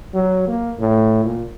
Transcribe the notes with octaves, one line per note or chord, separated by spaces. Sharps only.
F#3
A#3
A2
A#2